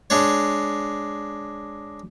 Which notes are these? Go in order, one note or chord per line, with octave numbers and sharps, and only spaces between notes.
G#3 D4 C#5